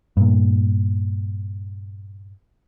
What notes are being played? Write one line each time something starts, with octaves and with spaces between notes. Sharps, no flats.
G2 A#2